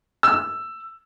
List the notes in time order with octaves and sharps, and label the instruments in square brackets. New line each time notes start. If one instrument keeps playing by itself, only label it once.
[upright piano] E6